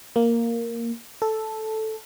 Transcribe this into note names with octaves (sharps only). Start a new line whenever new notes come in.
A#3
A4